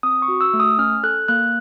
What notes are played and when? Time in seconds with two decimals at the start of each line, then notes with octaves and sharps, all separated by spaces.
0.03 C4 D#6
0.22 C#6
0.28 F#4
0.41 E6
0.54 A3
0.60 D#6
0.78 C#4 F6
1.03 A4 F#6
1.28 A#3 F#6